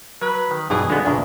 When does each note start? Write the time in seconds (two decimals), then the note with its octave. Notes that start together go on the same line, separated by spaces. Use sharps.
0.22 F#3 B4
0.51 D#3
0.70 B1 G2 B2 E3 G#4
0.90 D3 G#3 B3
1.05 A#1 E2 A#2 C#3 D4